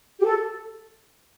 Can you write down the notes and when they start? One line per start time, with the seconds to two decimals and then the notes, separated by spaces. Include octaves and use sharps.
0.19 G4
0.24 A4